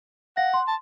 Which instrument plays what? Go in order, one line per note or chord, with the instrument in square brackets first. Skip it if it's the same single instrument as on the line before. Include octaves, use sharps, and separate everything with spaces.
[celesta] F5 A#6 [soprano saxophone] F#5
[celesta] C6
[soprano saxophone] A5